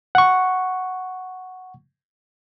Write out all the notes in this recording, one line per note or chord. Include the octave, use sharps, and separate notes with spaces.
F#5 C#6